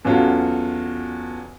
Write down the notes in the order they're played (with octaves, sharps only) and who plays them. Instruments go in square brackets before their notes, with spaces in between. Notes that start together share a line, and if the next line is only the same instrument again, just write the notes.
[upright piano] E2 F#3 C#4 F4 F#4 A4